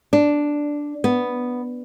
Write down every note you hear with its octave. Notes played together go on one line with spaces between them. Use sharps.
D4
B3